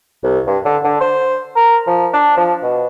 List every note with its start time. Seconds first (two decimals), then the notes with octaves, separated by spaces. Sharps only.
0.24 C2
0.47 G2
0.65 D3
0.84 D3
1.01 C5
1.56 A#4
1.87 F3
2.14 D4
2.37 F3
2.63 B2